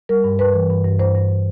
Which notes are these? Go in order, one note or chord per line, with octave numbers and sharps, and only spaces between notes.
G3 A#4
G2
G2 B4
E3
G2
G2
G2 C5
G2